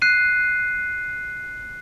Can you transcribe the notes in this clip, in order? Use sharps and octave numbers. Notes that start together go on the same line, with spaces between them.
F#6 C7 D#7